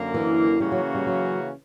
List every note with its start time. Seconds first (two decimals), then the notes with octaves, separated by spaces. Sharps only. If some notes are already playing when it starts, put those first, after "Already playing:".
Already playing: F#2 D3 A#3
0.14 E3
0.60 C#3 E3 G3 A#3 C#4 F#4
0.72 F#3
0.95 G3
1.07 F#3